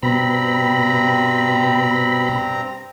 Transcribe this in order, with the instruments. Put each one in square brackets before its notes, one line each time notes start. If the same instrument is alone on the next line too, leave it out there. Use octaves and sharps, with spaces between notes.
[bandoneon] G2 C4 A#5 [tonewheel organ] B2 B5